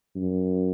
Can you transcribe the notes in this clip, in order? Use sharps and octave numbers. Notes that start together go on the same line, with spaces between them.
F#2